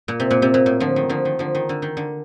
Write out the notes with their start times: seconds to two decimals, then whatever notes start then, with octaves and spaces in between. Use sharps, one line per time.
0.08 A#2
0.20 C3
0.31 A#2
0.42 C3
0.54 A#2
0.66 A2
0.80 D3 F3
0.96 D#3
1.09 D3 F3
1.25 D#3
1.39 D3 F3
1.55 D#3
1.69 D3
1.82 D#3
1.97 D3